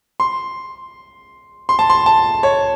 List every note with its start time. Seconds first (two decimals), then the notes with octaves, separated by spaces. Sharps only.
0.20 C6
1.69 C6
1.79 A5
1.90 C6
2.06 A5
2.43 C#5